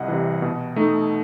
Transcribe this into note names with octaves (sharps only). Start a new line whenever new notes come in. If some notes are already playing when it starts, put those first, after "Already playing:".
Already playing: C2 D#5 F#5
C3 E3
B2
A3 D#4